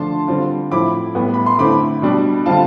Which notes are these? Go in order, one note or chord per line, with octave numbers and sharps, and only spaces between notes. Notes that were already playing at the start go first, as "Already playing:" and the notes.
Already playing: D3 F3 A3 D4 F4 A5 C6
D3 G3 C4 F4
A2 F3 C4 E4 B5 D6
A2 G3 B3
B5
C6
D3 A3 C4 E4 B5 D6
B2 G3 D4
D3 G3 C4 F4 F5 A5